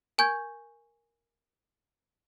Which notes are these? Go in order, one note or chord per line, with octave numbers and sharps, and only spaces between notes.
A#4 G#5 C#6 G6 G#6